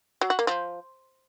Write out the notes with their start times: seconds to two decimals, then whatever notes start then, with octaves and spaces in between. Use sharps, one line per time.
0.21 F#3
0.30 F#4
0.39 A#3
0.47 F3